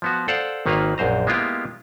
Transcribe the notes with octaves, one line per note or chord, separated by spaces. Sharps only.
F3 B3 F#4
A4 C5 D5 F5 F#5
G#1 D#3 A#3 B4 C#5 F5
A#1 F#2 C5 A#5
G#3 A#3 B3 E4 F4 G4